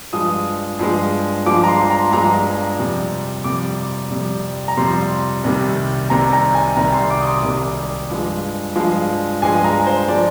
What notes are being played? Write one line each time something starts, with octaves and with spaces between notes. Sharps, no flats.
G2 F3 G#3 D#6
G2 F3 G#3
G2 F3 G#3 D6
A#5
C6
A#5
G2 F3 G#3 A#5
F2 C3 G3
F2 C3 G3 D6
F2 C3 G3
A#5
F2 C3 G3 C6
C2 C3 D#3 G3
C2 C3 D#3 G3 A#5
A#5
G#5
C2 C3 D#3 G3 A#5
C6
D6
D#6
D6
C2 C3 D#3 G3
G2 F3 G#3
G2 F3 G#3
G2 F3 G#3 G#5
A#5
C5
F3 G#3 D5